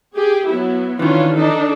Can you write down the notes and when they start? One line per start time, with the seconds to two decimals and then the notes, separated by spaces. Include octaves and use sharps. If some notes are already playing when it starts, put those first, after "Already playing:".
0.17 G4 G#4
0.48 F#3 B3 E4
0.99 D#3 E3 C#4 D4 F4
1.34 D4 D#4 A4